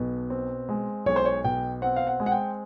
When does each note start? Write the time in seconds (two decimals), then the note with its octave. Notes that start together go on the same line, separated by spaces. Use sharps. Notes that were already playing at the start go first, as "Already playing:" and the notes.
Already playing: B1 B2
0.30 C4
0.69 G#3
1.06 B1 C#5
1.16 C5
1.25 C#5
1.44 B2 G5
1.82 C4 F#5
1.96 F5
2.07 F#5
2.20 G#3
2.26 F#5
2.32 G5